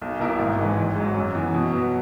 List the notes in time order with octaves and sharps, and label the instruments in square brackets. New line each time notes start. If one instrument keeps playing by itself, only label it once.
[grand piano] B1
B2 A#3 E4 A#4
G#1
G#2 E3
G#1
G#2 F#3
F#2
E3 B3
B2
F#3 B3